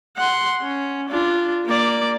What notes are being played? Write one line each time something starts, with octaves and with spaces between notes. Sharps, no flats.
F#5 C6
C#4
D4 F4
A#3 D5